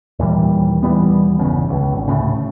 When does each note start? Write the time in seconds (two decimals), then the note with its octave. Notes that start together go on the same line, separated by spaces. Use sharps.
0.19 D#2 A#2 E3 G3
0.83 D#2 E3 G3 B3
1.38 G1 E2 C#3
1.70 C#2
1.93 G#1
2.08 D2 A2 C#3